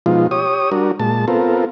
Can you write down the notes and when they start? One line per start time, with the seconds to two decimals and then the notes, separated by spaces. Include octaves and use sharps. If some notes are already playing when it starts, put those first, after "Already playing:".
0.06 B2 F3 G#3 D#4 F4
0.31 G4 C#5 D#6
0.72 G3 D4 F#4 A#4
1.00 A#2 G#3 A5
1.28 B3 C4 F4 A4 A#4